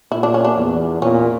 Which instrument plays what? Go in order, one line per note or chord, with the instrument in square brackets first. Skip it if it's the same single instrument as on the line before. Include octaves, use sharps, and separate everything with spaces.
[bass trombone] A#2 [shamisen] E4
[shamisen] D4
C#4
D4
[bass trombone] E2
[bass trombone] A#2 [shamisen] C#4